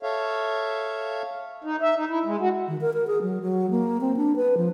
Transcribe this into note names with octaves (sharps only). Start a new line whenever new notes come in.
A4 C#5 E5 F5
D#4
E5
D#4
E4
G#3
F#4
D#3
A#4
A#4
G#4
F#3
F#3
A#3
C4
D4
B4
F3